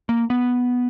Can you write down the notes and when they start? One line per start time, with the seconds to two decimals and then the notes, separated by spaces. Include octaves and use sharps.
0.09 A#3
0.30 B3